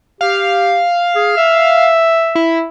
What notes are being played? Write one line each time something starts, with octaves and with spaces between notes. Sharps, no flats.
G4 F5
G#4
E5
E4